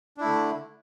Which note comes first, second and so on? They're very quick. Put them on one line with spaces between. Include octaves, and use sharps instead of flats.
D4 E4 A3 D3